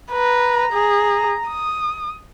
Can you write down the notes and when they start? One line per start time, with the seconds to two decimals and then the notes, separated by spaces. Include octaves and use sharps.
0.12 B4 A#5
0.73 G#4
1.49 D#6